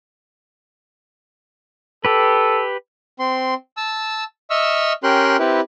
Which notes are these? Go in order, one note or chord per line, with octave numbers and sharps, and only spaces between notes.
G4 A4 B4
C4 C6
A5 E6
D#5 E5 C#6 E6 F6
C#4 G4 A#4 G5 C6 F#6
C4 E4 G4 B4